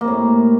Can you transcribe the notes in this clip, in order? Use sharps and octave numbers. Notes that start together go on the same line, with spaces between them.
A2 C3 A#3